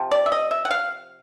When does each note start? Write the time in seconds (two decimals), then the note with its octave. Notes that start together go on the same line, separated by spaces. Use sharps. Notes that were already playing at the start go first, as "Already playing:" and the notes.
Already playing: C3 F3
0.11 D5
0.26 E5
0.32 D#5
0.51 E5
0.65 F#5
0.71 F5